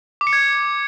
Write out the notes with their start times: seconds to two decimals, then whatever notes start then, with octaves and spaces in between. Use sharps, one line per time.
0.21 D6
0.27 C#7
0.33 G#6